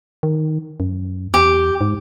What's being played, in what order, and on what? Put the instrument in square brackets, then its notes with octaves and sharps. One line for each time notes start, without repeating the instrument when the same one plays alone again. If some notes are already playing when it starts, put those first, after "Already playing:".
[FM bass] D#3
F#2
[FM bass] E2 [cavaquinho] G4
[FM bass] G#2